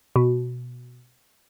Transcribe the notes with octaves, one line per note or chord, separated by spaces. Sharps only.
B2